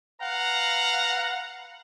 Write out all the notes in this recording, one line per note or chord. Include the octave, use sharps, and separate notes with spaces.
B4 F5 F#5 A#5